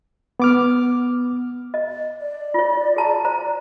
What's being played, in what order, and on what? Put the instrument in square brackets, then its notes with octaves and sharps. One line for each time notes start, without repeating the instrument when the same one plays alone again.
[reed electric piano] B3 D6 F6
[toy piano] D#5
[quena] D5
[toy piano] F4 C#5
G#4 A5 A#5
C5 A#5